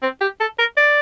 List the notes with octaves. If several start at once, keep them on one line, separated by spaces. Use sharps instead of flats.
C4
G4
A4
A#4
D5